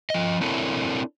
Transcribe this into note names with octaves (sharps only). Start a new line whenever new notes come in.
F3 D#5
C4 D4 E4 A4 A#4 C#5